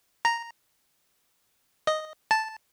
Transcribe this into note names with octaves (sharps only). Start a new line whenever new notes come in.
A#5
D#5
A5